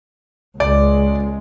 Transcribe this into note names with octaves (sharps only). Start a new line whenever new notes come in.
C#2 G#3 D5